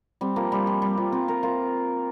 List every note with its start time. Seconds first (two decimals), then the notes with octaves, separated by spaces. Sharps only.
0.21 G3 C4
0.36 F3 A#3
0.52 G3
0.67 F3
0.82 G3
0.97 C4 F4
1.12 C4 F4
1.28 F4 A#4
1.43 F4 A#4